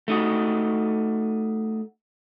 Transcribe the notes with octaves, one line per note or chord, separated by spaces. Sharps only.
A3 D#4 F#4